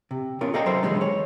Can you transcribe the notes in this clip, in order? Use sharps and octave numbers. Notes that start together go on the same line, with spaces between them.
C3
B3 C#4 F4 A#4
A4 D5 D#5 F5 G5 A#5
F#3 C5 E5
D3 E3 F3 G3 G#3 D4
C#5